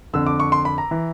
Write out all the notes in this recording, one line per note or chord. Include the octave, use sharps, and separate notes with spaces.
F2 D3 E6
D6
C#6
C6
B5
A#5
E3